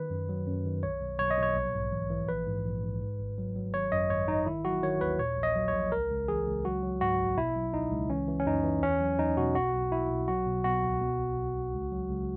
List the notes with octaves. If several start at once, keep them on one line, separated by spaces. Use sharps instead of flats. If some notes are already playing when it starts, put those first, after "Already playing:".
Already playing: D#3 B4
F#2
F#3
F#2
D#3
B1 C#5
B1
B1 C#5
D#5
B1 C#5
A#1
G#2
E3
E3
A#1 B4
G#2
A#1
G#2
G#2
G#1
F#3
F#3
G#1 C#5
F#2 D#5
G#1 C#5
G#1 D#4
D#3 E4
F#3 F#4
D#3 C#5
D#2 B4
A#2 C#5
A#1
D#5
F#3
C#5
A#1
C#2 A#4
C#2
E3 G#4
C#2
F#3 F#4
F#3
G#2 F#4
A#1
B2 E4
F#3
C#2 D#4
C#2
E3 C#4
E3
C#4
F#2 D#4
E3
E2 C#4
F#3
E2 D#4
B2 F#4
B1 F#4
B1
F#3 E4
B1
F#3 F#4
B2
B2 F#4
C#2
B2
B1
B1
B1
C#2
F#3
C#2